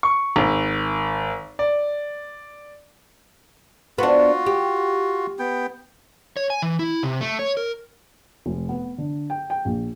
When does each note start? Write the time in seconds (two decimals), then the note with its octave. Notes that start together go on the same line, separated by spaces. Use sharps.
0.03 C#6
0.36 G#1
1.59 D5
3.98 B3 D4 F4 F#4
4.46 G4
5.39 B3 G5
6.37 C#5
6.50 G#5
6.62 E3
6.79 E4
7.03 C3
7.21 A3
7.39 C#5
7.57 A#4
8.46 F1
8.69 B3
8.98 D3
9.30 G5
9.50 G5
9.65 A#1